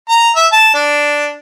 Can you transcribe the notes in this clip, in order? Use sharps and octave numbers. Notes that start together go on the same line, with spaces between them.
A#5
E5
A5
D4